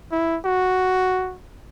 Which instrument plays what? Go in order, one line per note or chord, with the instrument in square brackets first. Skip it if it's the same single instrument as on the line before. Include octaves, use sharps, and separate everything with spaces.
[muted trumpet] E4
F#4